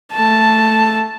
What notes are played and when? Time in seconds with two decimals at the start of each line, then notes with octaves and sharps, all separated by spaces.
0.13 A3 A5